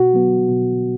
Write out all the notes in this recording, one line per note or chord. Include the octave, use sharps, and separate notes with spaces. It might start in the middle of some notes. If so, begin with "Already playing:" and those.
Already playing: B2 F#4
F#3 B3
B2